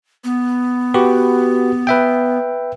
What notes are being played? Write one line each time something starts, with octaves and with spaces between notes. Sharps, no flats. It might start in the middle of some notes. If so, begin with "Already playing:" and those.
B3
F#4 G4 B4
B4 E5 G5